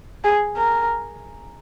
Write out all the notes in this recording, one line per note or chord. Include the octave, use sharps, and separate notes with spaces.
G#4
A#4